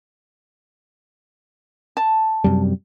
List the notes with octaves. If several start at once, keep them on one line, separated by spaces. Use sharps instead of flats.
A5
F#2 C3 G3